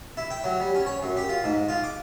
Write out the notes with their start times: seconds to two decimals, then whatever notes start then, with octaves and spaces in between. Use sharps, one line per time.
0.17 E4
0.31 G5
0.44 F#3
0.60 G3
0.75 C#4
0.86 C#5
1.03 F#2
1.17 G4
1.29 F4
1.44 G#2
1.69 F4
1.84 D6